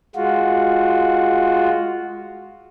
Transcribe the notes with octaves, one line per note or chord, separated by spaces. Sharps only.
G#3 F4 F#4